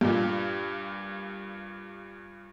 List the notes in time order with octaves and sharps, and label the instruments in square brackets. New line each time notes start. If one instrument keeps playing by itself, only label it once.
[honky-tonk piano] G2 A#2